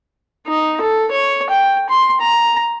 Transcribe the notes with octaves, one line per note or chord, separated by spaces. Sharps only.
D#4
A4
C#5
G5
C6
A#5